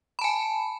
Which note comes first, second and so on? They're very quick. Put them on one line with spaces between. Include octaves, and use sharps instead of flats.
B5 A5 G#5